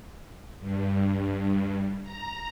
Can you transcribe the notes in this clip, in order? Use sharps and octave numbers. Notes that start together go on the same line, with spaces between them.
G2
A#5